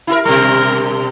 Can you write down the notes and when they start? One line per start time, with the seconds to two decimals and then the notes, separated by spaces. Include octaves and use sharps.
0.07 E4 F4 A#4
0.25 B2 G3 A#4